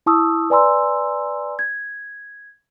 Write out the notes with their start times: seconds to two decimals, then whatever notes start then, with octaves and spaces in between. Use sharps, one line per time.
0.06 E4 A5 C#6 D#6 E6
0.50 B4 D5 G#5 A#5 C6 E6
1.59 G#6